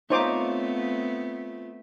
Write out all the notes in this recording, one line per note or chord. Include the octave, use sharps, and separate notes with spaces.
A3 B3 C4 D#4 F4 C5 C#5 D6